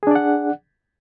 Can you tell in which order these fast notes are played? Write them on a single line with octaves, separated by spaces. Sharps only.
G#4 D4 D5 F#5